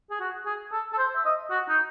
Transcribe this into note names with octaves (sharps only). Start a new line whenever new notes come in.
G#4
F#4
G#4
A4
A4
C5
E5
D#5
F#4
D#4